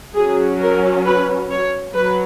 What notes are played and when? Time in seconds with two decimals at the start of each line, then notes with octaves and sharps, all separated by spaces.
0.16 F#3 C#4 G#4
0.61 A#4
1.05 B4
1.50 C#5
1.94 F#3 B4